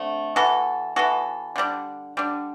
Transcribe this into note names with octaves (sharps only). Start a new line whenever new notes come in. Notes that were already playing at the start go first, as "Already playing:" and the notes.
Already playing: D3 A3 C4
E3 B3 F#4 A4
E3 B3 F#4 A4
D3 G3 D4
D3 G3 D4